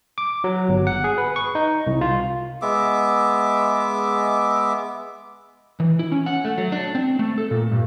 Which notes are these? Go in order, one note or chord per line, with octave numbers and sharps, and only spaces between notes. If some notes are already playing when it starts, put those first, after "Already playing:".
D6
F#3
G1
F#5
G#4
B4
C#6
D#4
C2
F4
G#3 B3 E5 D6
E3
E4
C#4
F#5
A3
F#3
D4
C4
A3
A4
A#2
G2